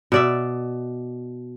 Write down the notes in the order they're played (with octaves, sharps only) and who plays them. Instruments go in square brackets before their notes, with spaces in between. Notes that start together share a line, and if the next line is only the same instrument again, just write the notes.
[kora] B2 D5 E5